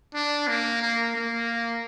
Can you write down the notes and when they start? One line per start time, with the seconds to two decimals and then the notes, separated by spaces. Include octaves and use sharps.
0.14 D4
0.48 A#3
0.82 A#3
1.15 A#3